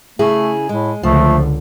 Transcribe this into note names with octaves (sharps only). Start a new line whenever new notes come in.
C#3 A3 E4 G#4
A2 G#3
C#2 D3 F3 A3